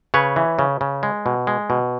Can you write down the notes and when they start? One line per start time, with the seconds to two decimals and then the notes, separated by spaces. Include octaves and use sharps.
0.14 C#3 B4 C#5
0.36 E3
0.59 C#3
0.81 C#3
1.03 G#3
1.26 B2
1.47 G#3
1.70 B2